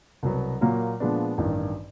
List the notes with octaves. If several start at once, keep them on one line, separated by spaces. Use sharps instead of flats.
C2 B2 F#3 B3
A#2 F#3 A#3
A#2 F3 G#3 B3 D4
A1 G2 D#3